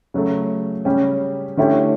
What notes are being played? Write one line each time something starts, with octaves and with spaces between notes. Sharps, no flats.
C#3 F#3 A3
C#3 G3 C#4 G4
D3 A3 C#4 E4 G4